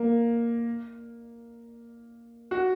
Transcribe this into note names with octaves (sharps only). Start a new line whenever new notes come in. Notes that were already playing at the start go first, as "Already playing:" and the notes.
Already playing: A#3
F#4